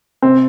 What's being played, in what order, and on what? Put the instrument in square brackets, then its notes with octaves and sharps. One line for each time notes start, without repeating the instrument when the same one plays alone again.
[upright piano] C3 [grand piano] C4